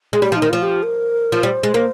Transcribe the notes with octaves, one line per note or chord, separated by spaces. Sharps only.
G#3
G3 G4
F3
D#4
D#3
F3 F4
G4
A#4
F3
G3 C5
G#3
A#3